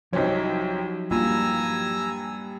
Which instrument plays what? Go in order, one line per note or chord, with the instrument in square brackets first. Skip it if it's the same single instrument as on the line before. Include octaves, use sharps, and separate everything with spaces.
[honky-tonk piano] C2 C4 C#4 [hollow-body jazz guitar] F3 F#3 D#4
[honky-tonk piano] G2 [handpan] A#3 F4 [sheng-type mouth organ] G#5 A#5 E6